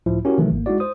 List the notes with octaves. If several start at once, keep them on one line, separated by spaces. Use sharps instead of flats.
C#2 A2 F3 E4
C#4 E4 F#4 G4 A#4
C3 D#3 E3 F#3 A3
G#1 A#3
G#3 D#4 E4 F#4 D5
C5 D#6